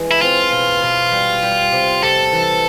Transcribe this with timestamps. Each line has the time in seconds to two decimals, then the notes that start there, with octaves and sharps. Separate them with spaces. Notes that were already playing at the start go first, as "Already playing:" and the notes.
Already playing: E3 G#3
0.11 E4
0.22 C4 F4
0.52 B2
0.82 B2
1.12 G3
1.42 G3
1.72 C3
2.03 C3 A4
2.32 E3